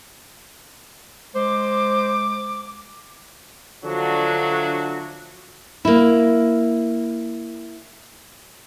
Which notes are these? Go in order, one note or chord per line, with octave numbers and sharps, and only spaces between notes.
G#3 C5 D6
D3 F3 F#3 A3 D4 F#4
A#3 E4